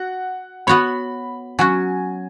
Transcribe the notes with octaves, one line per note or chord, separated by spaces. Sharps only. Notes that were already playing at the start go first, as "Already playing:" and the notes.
Already playing: F#4 F#5
B3 F#4 C#5 B5
F#3 C#4 F#4 G#5